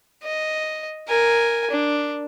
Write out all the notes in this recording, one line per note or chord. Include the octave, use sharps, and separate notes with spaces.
D#5
A#4 G#5
D4